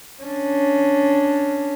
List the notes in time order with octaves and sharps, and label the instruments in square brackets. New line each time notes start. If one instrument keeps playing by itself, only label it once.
[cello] C#4 D4